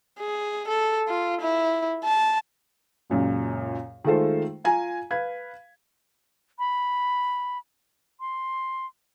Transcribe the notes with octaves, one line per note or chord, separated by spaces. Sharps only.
G#4
A4
F4
E4
A5
C#2 F#2 A#2
D#3 G#3 A3 F4 A4 C5
F4 G#5 A#5
B4 F5 G#6
B5
C6